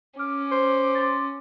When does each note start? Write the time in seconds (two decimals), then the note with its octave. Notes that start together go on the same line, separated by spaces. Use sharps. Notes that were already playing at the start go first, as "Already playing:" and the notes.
0.19 C#4 D6 F6
0.51 C5
0.95 C6 A6